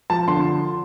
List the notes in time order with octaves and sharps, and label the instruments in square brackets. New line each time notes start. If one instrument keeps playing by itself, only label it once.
[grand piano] F3 A5
D3 C6